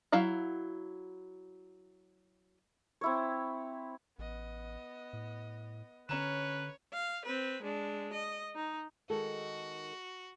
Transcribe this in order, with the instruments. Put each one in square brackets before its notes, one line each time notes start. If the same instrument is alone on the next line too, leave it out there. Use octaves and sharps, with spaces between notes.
[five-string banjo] F#3 E4 F5 F#5
[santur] C4 E4 C#5
[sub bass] A1 [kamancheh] B3 D#5
[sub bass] A2
[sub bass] D3 [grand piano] C#4 A#5 E7 [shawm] B4 [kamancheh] C#5
[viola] F5
C4 B4
G#3 D4
D#5
D#4
[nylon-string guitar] D#3 G#3 A4 [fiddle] F#4